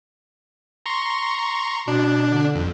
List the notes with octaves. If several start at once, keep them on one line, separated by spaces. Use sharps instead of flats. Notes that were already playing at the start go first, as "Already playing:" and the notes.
A#5 C6 C#6
B2 D4
D3
F2